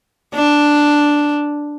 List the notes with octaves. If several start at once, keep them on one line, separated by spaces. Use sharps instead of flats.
D4